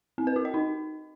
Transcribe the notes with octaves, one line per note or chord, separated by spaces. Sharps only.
C4
B4
F#4
D#5
D#4